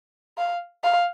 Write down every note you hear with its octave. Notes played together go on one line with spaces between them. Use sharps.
F5
F5